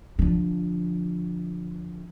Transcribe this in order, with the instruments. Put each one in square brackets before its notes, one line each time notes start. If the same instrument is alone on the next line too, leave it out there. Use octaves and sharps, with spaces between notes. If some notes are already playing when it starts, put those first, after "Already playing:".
[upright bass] D3 F3